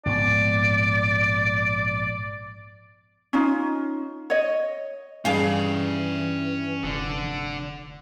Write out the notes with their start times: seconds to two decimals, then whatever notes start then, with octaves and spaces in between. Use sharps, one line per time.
0.06 A#1 G#2 B3 D5
3.33 C#4 D#4 F4
4.30 C#5 D#5
5.25 G2 E3 C#4 G#4 F5 B5
6.83 F1 D3